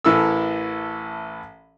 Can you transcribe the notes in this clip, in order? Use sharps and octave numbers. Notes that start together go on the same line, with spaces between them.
A1 E3 E4 A4 A#4 E6